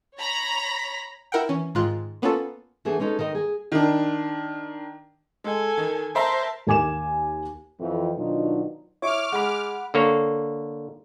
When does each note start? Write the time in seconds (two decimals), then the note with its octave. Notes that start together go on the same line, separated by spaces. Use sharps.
0.17 C#5 A#5 B5 A#6
1.32 E4 A#4 F#5 G5
1.49 E3 C#4
1.75 G#2 D#3 F4 F#6
2.22 A#3 B3 C#4 F4 A4
2.85 E3 A3 B3 D4 G#4
3.00 G#3 C#4 D#4 G#4 A4
3.19 D#3 A#4 D#5
3.35 G#4
3.72 D#3 D4
5.44 G#3 A4 G#5
5.78 D#3
6.15 A#4 C5 E5 A5 A#5
6.67 D#2 A#4 G#5 D6 E7
7.80 F2 E3
8.16 B2 D#3 F#3 D4 D#4 F4
9.02 E4 C#5 C#6 D6 F6
9.32 G#3 F#5 B5
9.94 D3 A#3 C#5